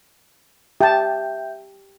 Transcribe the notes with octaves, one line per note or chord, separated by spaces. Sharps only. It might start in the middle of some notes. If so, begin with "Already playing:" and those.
G4 E5 G5 A5 G6